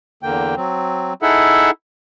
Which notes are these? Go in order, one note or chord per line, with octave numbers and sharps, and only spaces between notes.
E2 D3 A#3 G5
F#3 C4
D#4 E4 G#4 A4 E5 F#5